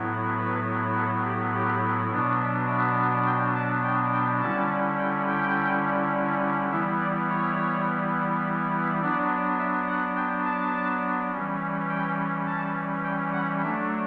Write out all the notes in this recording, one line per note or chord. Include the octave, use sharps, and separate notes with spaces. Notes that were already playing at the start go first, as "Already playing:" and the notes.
Already playing: A2 F#3 B3 E4
B4
A4
G4
G4
B2 F#3 B3 D4
E5
E5
G5
A5
G5
G5
D3 G3 C#4 E4 A5
G5
G5
E3 G3 B3 E4 E5
D5
C#5
F#3 B3 D4 D5
E5
F#5
G5
A5
E3 G3 C#4
G5
A5
G5
F#5
F#3 A3 D4 E5